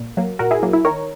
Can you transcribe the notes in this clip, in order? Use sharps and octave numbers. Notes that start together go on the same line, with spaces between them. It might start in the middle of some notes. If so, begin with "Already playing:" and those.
Already playing: A#2
F#3 A#3
A#2 F#4 A#4
E4 G#4
F#3 A#3
E4
D#3 A#4 C#5